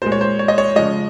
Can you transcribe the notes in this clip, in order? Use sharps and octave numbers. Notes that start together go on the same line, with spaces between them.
A#2 G#3 C5
C#5
C5
C#5
D#5
C#5
C#3 F3 G#3 D#5